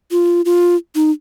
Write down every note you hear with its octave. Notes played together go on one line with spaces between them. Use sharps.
F4
F4
D#4